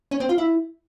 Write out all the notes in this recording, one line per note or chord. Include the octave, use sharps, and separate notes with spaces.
C#4
C4
F4
E4